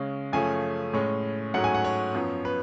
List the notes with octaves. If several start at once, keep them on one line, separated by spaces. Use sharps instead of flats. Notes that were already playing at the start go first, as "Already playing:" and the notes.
Already playing: C#3 G#3 C#4
F#2 C#3 F3 A3 C#4 G#5
A2 G#3 C#4
G#2 F#3 A3 C#4 F#5
G#5
F#5
C#5
F#2 F3 B3
B4